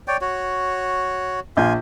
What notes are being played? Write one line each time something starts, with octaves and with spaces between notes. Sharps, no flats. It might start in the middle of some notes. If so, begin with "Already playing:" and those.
C#5 D5 G5
F#4 C#5
A#1 F4 G#5 G6